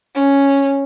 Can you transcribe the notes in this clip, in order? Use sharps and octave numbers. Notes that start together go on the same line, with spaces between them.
C#4